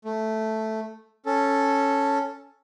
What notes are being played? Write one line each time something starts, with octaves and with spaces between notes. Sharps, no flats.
A3
C#4 A4